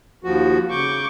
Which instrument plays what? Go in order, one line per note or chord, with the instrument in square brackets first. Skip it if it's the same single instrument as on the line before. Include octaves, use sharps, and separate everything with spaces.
[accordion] D#2 F3 F#4
[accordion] C#3 G6 [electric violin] C#6 D6